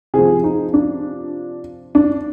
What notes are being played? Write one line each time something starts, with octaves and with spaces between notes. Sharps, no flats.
C3 F3 G#4
D#4
D4
D4